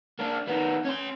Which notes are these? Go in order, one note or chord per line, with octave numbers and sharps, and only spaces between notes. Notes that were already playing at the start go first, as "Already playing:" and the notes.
A#3 D4
D#3 B3
C#4 C6